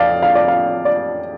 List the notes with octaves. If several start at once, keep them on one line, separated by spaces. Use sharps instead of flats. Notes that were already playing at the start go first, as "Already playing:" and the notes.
Already playing: F2 D5 F5
F5
D5
F5
D5